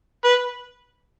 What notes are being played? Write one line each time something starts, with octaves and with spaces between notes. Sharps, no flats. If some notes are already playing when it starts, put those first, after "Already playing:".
B4